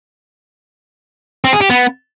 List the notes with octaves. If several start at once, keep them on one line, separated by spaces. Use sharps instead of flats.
C4
G#4
G4
B3